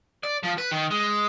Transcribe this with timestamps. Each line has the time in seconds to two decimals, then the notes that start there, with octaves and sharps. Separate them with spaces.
0.23 D5
0.43 F3
0.58 B4
0.71 D#3
0.91 G#3